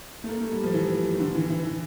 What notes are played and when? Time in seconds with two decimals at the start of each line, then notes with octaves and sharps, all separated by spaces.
0.24 A3
0.28 A#3
0.40 A3
0.52 G3
0.63 F3
0.74 E3
1.14 D#3
1.20 D3
1.34 E3
1.50 E3
1.65 E3